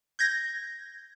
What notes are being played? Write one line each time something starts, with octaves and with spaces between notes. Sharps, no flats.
G6 G#6 A#6